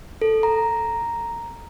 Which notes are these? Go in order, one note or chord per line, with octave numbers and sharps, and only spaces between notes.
A4
A#5